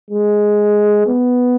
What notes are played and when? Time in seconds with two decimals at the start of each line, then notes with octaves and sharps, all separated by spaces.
0.11 G#3
1.07 B3